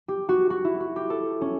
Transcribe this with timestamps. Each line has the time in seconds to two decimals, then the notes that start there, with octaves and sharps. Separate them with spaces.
0.08 G4
0.29 F#4
0.50 F#4
0.65 E4
0.80 F#4
0.96 G4
1.10 A4
1.41 C#4